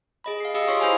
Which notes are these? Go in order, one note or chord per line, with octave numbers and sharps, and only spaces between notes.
G#4 D#5 B5
F5 C7
G4 G#4 D#5 F5 D#6 E6
F4 C#5 C6 C#6 D#6 C7
E4 C5 F5 G#5 A#5